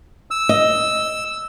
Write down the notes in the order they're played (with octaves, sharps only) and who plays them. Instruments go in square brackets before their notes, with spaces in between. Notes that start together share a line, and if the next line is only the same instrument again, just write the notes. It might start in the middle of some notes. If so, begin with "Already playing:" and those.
[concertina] E6
[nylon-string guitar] D#5